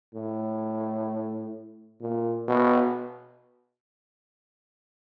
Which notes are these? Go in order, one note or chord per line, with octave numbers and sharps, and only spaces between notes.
A2
A#2
B2